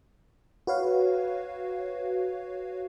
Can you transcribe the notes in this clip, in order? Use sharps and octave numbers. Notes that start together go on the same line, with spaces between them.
F#4 B4 C#5 F5